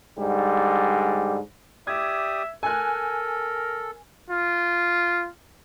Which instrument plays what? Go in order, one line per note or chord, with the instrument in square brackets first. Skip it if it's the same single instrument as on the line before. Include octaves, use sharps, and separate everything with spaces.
[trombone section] G#2 D3 G3
[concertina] G4 D5 D#6 [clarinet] E5 [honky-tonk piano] G#6
[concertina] A4 [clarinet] A#4 [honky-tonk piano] G#5 F#6
[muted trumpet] F4